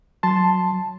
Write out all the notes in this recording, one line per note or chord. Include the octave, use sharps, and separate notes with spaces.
F#3 A5 C6